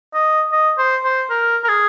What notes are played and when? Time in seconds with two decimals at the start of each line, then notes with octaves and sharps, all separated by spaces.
0.14 D#5
0.52 D#5
0.78 C5
1.04 C5
1.30 A#4
1.64 A#4
1.68 G#4